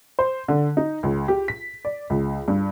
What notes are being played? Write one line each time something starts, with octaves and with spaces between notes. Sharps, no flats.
C5
D3
D#4
C#2
G4
B6
D5
C#2
G2